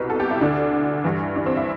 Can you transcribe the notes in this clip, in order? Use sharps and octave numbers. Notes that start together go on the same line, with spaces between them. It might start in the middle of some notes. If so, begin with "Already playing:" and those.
Already playing: C2 B2 B4
A4
G4
E4
D2 D3 D4
G2 E3
D4
C4
E4